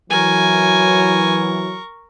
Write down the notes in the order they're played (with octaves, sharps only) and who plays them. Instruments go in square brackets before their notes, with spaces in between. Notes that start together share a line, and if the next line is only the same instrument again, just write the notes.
[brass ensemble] E3 F#3 [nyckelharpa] A#4 C#6 [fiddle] G#5